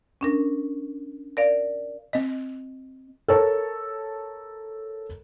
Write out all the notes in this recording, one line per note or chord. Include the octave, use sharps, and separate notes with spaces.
C#4 D4 A#4
A#4 D5 F5
C4 D#5
A4 A#4 C#5